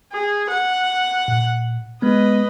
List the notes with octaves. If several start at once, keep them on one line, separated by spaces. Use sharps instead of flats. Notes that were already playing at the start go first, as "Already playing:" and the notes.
G#4
F#5
A#2
G#3 B3 B4 D#5